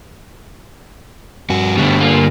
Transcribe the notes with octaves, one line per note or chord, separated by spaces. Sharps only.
G2 F#4
G2 B2 D3 G3 A3
A#3 F4